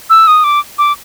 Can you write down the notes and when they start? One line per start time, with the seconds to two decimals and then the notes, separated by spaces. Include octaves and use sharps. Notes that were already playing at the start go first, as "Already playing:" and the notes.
0.10 E6
0.27 D#6
0.44 D6
0.78 D6